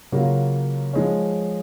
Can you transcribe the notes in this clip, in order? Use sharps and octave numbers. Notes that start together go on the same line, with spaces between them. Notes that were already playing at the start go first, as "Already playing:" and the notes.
C#3 F#3 A#3 F4
F3 G#3 C#4